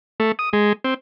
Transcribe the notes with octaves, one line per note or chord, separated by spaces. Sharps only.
A3
D#6
G#3
C4